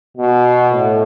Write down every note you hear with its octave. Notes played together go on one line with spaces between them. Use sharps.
B2
A2